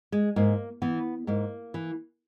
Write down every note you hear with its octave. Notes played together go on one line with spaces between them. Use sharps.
G#3
G#2 A#3
E3 B3
G#2 A#3
E3